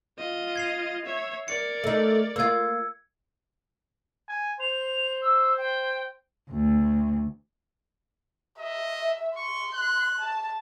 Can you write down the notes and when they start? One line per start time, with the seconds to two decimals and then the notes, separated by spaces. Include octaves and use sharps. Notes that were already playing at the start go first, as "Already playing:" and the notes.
0.18 F4 D#5
0.56 G#6 C7 F7
1.05 C#5 E5
1.48 A#4 D5 C#7
1.84 A3 D#4
2.36 A#3 F4 E6 G#6
4.28 G#5
4.60 C5 F7
5.22 E6
5.58 G5
6.50 D2
8.59 D#5 E5
9.36 C6 C#6
9.74 F#6
10.19 A5